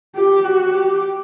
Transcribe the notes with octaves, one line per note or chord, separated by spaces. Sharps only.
G4
F#4
G4